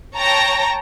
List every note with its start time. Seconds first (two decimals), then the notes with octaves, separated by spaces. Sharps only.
0.18 C#5 G5 A5 A#5 A#6